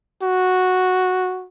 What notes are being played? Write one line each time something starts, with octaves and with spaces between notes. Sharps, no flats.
F#4